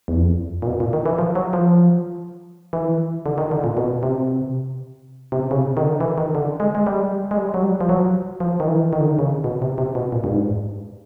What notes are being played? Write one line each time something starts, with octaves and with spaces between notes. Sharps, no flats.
E2
F2
A#2
B2
A#2
D#3
E3
F3
F#3
F3
E3
D3
D#3
D3
A#2
B2
C3
C3
C#3
C3
D#3
D3
E3
D#3
D3
G#3
G#3
G3
G#3
G3
F#3
G3
F3
F#3
F3
D#3
E3
D#3
D3
D#3
C#3
B2
C3
C3
B2
A#2
G2
G#2